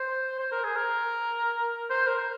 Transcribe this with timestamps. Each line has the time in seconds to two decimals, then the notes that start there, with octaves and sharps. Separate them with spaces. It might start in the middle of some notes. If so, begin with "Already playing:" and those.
Already playing: C5
0.40 C5
0.51 A#4
0.64 G#4
0.75 A#4
1.90 C5
2.07 A#4